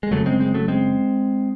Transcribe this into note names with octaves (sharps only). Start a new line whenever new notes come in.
G#3
F#1 F#2 C#3 F#3 A3
G#3 C4
G#3 C4
F#3 A3
G#3 C4